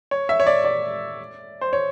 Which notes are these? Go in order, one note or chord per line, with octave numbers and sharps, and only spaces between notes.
C#5
E5
C#5
D5
D5
C5
C#5